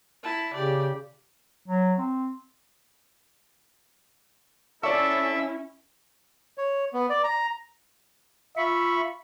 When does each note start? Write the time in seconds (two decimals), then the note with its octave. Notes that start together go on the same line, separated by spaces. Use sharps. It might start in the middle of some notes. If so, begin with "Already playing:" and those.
0.23 E4 A5
0.54 C#3 G4 D5
1.68 F#3
1.99 C4
4.83 C#4 E4 A4 D5 E5 C#6
6.58 C#5
6.94 B3
7.10 D5
7.24 A#5
8.57 F4 E5 B5 C#6